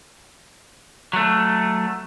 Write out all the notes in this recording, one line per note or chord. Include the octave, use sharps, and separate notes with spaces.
F#3 A3